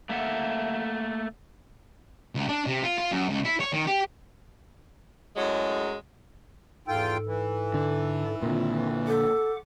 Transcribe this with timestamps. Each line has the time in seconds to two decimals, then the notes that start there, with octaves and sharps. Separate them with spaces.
0.09 A3 A#3 E5 F#5
2.35 C#2
2.49 D4
2.67 C3
2.83 F4
2.98 F4
3.11 F#2
3.29 C#2
3.45 E4
3.60 C#5
3.73 D#3
3.87 G4
5.36 F#2 A2 F#3 G#3
6.88 E2 G#2 F4 A4 G5
7.26 E3
7.74 D3
8.42 A#2 D3 D#3 C4 F4
9.07 A4 F#5 D6